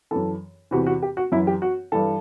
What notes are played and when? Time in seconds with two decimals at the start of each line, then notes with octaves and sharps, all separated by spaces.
0.11 F#2 E3 A4
0.71 E2 C3 E3 F#4
0.87 F#4
1.02 G4
1.17 F#4
1.32 F#2 E4
1.36 E3
1.47 G4
1.62 F#4
1.92 G2 E3 A4